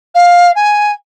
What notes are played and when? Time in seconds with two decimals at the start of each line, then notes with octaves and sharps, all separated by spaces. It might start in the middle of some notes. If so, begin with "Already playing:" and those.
0.14 F5
0.55 G#5